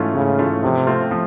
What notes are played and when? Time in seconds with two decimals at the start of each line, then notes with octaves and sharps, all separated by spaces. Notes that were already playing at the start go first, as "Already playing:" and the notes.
Already playing: G#2 E3 A3 C#4 F4
0.14 G#2 C#3
0.39 E3 A3 C#4 F4
0.63 C3 F3
0.87 A3 C4 F4
1.11 F3